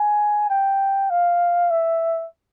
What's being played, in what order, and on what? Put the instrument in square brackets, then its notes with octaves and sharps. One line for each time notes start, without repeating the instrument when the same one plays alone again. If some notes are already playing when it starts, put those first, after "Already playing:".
Already playing: [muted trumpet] G#5
G5
F5
E5